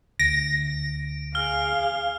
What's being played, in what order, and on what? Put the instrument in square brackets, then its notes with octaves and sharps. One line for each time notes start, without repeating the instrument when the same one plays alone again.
[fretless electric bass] D2 [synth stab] A#6 [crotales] D7
[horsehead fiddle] G#4 F5 [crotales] F6 G7